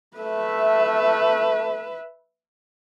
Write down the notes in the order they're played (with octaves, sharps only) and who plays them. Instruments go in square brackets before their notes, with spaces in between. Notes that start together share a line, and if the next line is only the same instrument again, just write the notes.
[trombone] A3 [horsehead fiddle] B4 E5